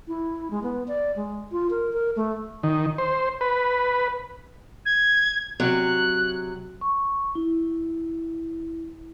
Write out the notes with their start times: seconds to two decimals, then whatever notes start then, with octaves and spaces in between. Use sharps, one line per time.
0.08 E4
0.51 G#3
0.63 B3
0.88 D5
1.16 G#3
1.52 F4
1.70 A#4
1.93 A#4
2.16 A3
2.63 D#3
2.98 C5
3.41 B4
4.85 G#6
5.60 C3 F#3 F#6
6.81 C#6
7.35 E4